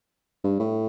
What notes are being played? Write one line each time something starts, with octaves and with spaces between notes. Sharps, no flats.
G2
A2